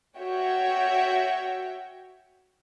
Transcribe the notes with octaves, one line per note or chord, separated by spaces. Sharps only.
F#4 C#5 E5 G5